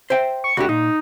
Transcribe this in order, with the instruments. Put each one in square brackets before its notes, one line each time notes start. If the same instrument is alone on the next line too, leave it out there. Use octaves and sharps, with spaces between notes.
[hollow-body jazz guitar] C5 E5 G5
[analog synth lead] C#6
[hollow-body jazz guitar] D2 D3 G4 [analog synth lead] F#4
[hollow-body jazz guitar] A#2 [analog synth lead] D#4